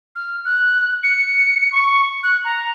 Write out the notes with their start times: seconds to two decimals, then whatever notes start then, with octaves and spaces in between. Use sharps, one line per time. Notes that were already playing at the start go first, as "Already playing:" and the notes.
0.15 F6
0.45 F#6
1.03 C#7
1.72 C#6
2.23 F#6
2.44 A#5